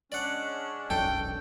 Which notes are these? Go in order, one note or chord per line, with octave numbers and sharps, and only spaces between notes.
G#3 C#4 D4 D5 F#5
E1 B1 F#2 A4 G5